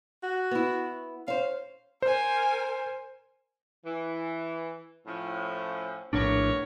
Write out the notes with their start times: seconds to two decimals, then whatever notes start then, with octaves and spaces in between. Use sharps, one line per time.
0.23 F#4
0.51 B3 E4
1.28 C#4 C5 F5
2.02 A#4 C5 G#5
3.85 E3
5.07 A2 F3 C#4
6.13 A#1 A2 B3 D4 A#4 C#5